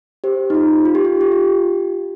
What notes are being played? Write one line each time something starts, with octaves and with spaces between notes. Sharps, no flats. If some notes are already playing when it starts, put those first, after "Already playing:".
G4 C5
D#4
F4
F4
G4
F4
G4
F4